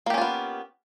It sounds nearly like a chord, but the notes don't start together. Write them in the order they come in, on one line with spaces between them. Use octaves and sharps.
A#3 G4 C#4 F4 B3